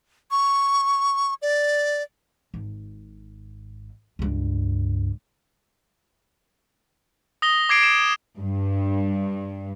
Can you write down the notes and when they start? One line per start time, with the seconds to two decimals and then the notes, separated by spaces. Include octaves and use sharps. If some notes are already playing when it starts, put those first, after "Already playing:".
0.31 C#6
1.42 D5
2.54 G#1
4.19 C#2 G2
7.42 D#6 A#6 G7
7.69 D6 G#6 C7 D7
7.81 D7 E7
8.39 G2